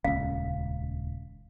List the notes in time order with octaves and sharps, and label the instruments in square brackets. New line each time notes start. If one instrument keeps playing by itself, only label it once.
[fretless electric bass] D#1 C#2 [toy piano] F5